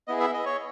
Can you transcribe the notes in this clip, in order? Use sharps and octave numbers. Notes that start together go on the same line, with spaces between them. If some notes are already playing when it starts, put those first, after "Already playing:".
B3 E4 G#4 D#5
E5
D#5
C#5